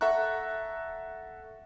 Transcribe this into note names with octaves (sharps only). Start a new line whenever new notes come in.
A4 E5 F#5 A#5 C#6 F#6